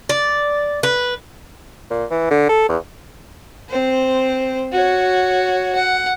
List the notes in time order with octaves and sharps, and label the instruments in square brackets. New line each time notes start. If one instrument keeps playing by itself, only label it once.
[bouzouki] D5
B4
[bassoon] A#2
E3
D3
A4
E2
[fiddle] C4 C5
F#4 C#5
F#5